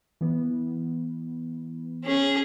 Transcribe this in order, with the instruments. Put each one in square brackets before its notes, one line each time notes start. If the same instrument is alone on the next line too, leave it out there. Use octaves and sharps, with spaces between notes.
[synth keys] E3 B3
[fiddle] C#4 G#4